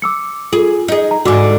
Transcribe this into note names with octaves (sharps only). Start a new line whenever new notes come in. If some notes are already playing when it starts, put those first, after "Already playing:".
D6 E6 C#7
F4 G#4 A4
D#4 G#4
A#5
G#2 D3 F#4 D6